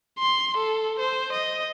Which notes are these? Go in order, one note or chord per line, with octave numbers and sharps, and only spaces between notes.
C6
A4
C5
D#5